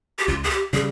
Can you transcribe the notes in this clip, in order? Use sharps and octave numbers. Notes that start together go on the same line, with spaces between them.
G4
C#2 F4
G#4
G4
C#3 G3 G#4